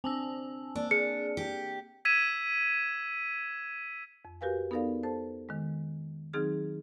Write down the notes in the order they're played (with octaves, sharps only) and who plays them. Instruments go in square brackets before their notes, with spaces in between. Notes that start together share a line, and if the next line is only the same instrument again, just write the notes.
[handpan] C4 D4 [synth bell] G#5 A5 E6
[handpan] A#3 [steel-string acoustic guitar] D4
[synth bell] G#4 [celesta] C#7
[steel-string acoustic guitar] G4
[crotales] E6 G#6 B6 D#7 E7
[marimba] F2
F#4 G4 A#4 B4 F5 G#5
B3 D#4 A4 A#4 D5 F5
A4 C5 A5
D#3 G#3
D#3 F#3 C4 D#4 G#4 F6